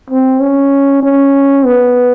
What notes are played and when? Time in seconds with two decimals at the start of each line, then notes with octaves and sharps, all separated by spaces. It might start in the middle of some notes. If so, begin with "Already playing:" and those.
0.10 C4
0.40 C#4
1.03 C#4
1.65 B3